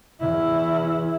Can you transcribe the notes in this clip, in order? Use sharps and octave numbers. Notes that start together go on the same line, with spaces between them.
E2 E4